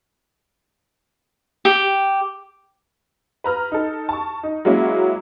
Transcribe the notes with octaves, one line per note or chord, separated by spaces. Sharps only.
G4
B4 A#5 F6
D#4 A4
A5 C#6
D#4
F#3 G#3 A#3 C#4 E4